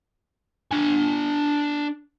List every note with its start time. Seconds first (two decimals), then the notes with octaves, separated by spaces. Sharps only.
0.71 D4 G#5